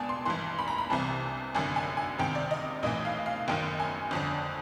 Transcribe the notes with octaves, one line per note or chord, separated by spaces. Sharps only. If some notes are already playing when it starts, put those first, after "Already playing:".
Already playing: C#2 B2 D5 G#5 A5
C6
G#1 G2 E3 C6
B5
A#5
B5
C2 C3 E3 A5
G#1 F#2 D3 G#5
G#5
G#5
C#2 C3 D#3 G5
D5
D#5
B1 A2 E3 D#5
F5
F5
F#1 F#2 D#3 G5
G#5
G1 F2 D3